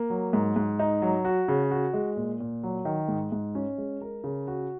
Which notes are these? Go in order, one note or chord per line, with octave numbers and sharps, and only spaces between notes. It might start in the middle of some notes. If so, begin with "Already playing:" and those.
Already playing: A#3
F#3
G#2
G#2
D#4
F#3
F#4
C#3
F#4
G#3
A#2
A#2
F#3
D#3
G#2
G#2
C#4
G#3
A#4
C#3
F#4